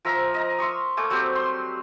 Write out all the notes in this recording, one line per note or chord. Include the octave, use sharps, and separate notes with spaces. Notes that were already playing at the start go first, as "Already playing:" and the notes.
F3 A#4 E5 A#5
D#5 A#5
E5 C6 C#6 D#6
A3 A#3 G#5 D6
F#3 G3 C4 G4
C6